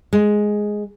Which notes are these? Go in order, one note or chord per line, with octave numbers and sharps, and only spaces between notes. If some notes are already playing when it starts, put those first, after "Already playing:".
G#3